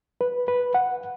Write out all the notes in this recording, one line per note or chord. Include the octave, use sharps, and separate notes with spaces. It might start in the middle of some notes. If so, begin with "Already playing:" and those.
B4
B4
F#5